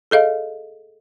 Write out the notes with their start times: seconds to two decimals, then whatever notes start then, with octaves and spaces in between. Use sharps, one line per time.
0.11 G#4 A4 D#5 F5